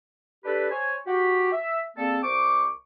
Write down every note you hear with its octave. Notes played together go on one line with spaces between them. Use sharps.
D4 G4 A4 B4
C5 C#5 G#5
F#4 G4
E5
G3 A#3 C4 G#4 A4
C2 C5 C#6 D6